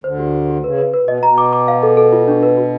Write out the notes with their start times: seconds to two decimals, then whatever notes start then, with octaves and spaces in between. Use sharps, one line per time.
0.04 D2 D3 C5
0.19 G4
0.34 G4
0.49 G4
0.64 C#3 B4
0.78 B4
0.94 B4
1.04 B2 D#5
1.23 B2 A#5
1.38 D6
1.53 D6
1.68 F5
1.83 A4
1.97 A4
2.12 F4
2.28 D4
2.43 B4
2.57 F#4